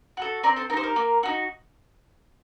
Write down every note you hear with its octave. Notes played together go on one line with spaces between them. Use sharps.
F#4 A4
C4 A#4 D5
A4 C5
D#4 G4 A#4 C5
A#4
A#3
D#4 F#4